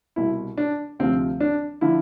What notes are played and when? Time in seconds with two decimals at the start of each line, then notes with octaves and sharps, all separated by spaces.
0.16 C2 B2 E4
0.58 D4
0.99 D2 C3 F3 C4
1.40 D4
1.81 D3 F3 E4